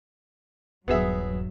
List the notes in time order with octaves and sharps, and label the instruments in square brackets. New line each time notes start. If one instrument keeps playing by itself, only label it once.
[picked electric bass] D#1 [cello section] G2 F#3 [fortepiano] B3 G#4 E5